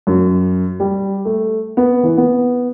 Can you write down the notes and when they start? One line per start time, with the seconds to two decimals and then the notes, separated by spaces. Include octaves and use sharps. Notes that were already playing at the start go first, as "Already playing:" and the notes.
0.07 F#2
0.80 G3
1.25 A3
1.77 B3
2.03 E3
2.17 B3